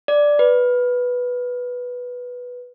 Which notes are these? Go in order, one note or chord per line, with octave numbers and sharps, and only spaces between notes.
D5
B4